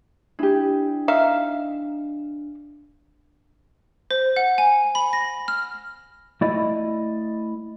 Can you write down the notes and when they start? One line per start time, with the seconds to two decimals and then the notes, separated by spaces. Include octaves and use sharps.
0.39 D4 E4 G4
1.08 D#4 E5 F5
4.11 C5
4.36 F#5
4.58 G#5
4.95 B5
5.13 A#6
5.48 F6
6.41 A3 E4 D5 D#5